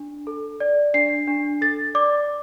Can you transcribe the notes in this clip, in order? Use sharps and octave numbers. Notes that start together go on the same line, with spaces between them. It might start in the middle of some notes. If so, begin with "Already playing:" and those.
Already playing: D4
A4
D5
D4 C7
D4
A4 A6
D5 D6